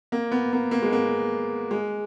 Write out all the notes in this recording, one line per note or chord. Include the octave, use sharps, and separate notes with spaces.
A#3
B3
A#3
A#3
G#3
A#3
G#3